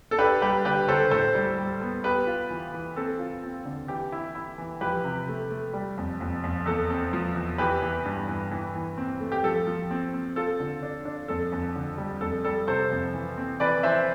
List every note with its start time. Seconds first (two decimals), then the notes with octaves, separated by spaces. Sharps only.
0.11 A4
0.19 D4 G4 B4
0.41 G3 G4 B4
0.65 D3 G4 B4
0.88 D3 A4 C5
1.11 A2 A4 C5
1.35 G3
1.58 G3
1.81 B3
2.04 B3 G4 B4
2.27 F4
2.50 E3
2.74 E3
2.96 C4 A4
3.19 F4
3.43 C4
3.65 D3
3.88 E3 G4
4.12 E4
4.35 E4
4.58 E3
4.81 F3 G4 B4
5.04 C3
5.28 A3
5.50 A3
5.73 G3
5.98 F2
6.21 F2
6.44 F2
6.66 E2 A4
6.90 C4
7.13 F3
7.35 E2
7.58 E3 G4 B4
7.82 E3
8.05 G2
8.28 E3
8.51 E3
8.75 E3
8.97 C4
9.20 A3
9.32 G4
9.44 F3 A4
9.67 F3
9.91 C4
10.14 C4
10.36 F4 A4
10.60 D3
10.83 D4
11.05 D4
11.28 F2 A4
11.52 F2
11.75 D3
11.98 G3
12.21 F2 A4
12.45 G3 A4
12.67 C3 A4 C5
12.91 F2
13.14 E3
13.38 C4
13.60 E3 B4 D5
13.83 E3 C5 E5